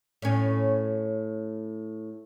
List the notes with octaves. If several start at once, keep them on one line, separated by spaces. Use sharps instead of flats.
A2 C#4